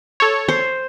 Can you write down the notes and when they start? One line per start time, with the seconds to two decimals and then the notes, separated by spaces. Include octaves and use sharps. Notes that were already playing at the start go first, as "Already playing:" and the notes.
0.20 A4 C#5
0.48 C5